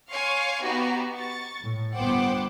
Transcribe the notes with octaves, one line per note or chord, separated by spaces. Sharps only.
C#5 F5 G#5 C6 C#6
B3 D#4 F#4 G4 A#5
C#6 A6
A2
G1 B3 C5 F#5 G5 D6